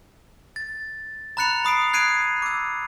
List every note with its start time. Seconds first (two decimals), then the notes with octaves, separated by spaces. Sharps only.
0.56 A6
1.37 A#5 B5 F#6 A6 C#7 F7
1.65 B5 D#6 C7 D7
1.93 F#6 G#6 C7 D7 D#7
2.42 D6 E6